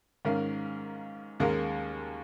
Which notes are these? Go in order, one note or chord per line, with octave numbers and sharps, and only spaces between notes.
G#2 D#3 C#4 A#4 F5
D#2 D#3 G#3 C#4 A#4